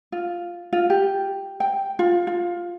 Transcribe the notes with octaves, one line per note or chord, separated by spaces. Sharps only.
F4
F4
G4
G5
F4
F4